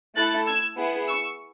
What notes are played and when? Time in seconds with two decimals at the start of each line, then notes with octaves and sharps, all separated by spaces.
0.15 A3 E4 A4 F#6 A6
0.46 E6 G#6
0.77 B3 E4 G#4
1.08 C#6 E6